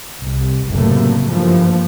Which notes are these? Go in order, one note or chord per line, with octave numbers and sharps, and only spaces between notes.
C2
F#1 A2 C3 F#3 A3 A#3
G2 E3 F3 A3 A#3